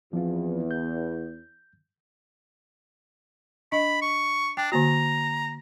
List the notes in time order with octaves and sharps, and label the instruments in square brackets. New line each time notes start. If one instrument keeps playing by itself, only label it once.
[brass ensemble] E2 [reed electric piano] F3 C4 F4
[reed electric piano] G6
[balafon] D4 D#5 [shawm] B5
[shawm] C#6
[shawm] D4 [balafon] G5
[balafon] D3 A#3 F#4 [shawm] A#5